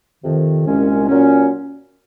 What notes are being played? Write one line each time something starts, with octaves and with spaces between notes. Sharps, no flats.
F2 C3 D#3
C2 A#2 G#3 C#4
A#2 F#3 C#4